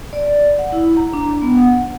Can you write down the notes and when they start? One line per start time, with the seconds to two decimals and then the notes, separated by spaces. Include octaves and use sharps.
0.13 D5
0.59 F#5
0.72 E4
0.97 A#5
1.13 D4
1.42 B3
1.57 F#5